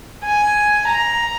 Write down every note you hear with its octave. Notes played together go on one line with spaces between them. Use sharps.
G#5
A#5